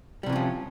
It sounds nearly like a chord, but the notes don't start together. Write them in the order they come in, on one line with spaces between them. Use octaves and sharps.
G3 C3 E3 C#4 F3